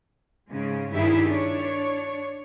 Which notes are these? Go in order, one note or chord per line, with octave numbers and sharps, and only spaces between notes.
G#2 C#3 G#3
G2 D#3 E4 G4 G#4 E5
D4 C#5